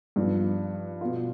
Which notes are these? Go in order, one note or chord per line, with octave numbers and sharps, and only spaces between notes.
G2 F3 B3
B2 B3 F4